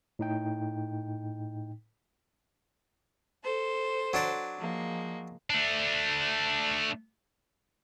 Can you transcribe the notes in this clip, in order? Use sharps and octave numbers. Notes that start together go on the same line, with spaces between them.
A2 D#4 G5
A4 C5
F#3 D4 D5
F3 G#3 A#3
A3 D4